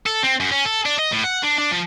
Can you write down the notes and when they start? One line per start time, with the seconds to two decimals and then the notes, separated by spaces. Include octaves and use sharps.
0.06 A4
0.23 C4
0.40 F#2
0.52 C#4
0.65 A4
0.85 D4
0.98 D#5
1.12 A2
1.24 F#5
1.43 D4
1.58 D4
1.72 F3